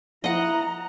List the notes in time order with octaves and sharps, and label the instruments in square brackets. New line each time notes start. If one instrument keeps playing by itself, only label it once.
[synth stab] F3 [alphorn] E4 [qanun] D#5 F#5 [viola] A#5